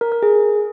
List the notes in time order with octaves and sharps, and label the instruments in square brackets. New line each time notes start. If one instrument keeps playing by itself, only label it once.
[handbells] A#4
A#4
G#4